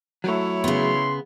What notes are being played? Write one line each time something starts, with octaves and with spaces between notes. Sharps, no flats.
F#3 A3 E4 C#5
C#3 B3 C6